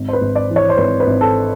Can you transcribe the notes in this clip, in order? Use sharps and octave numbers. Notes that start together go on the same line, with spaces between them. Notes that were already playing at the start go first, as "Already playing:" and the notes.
Already playing: G#1
C5
B4
G#1
D5
E3
C#5
C5
G#1 B4
B4
G#1
A4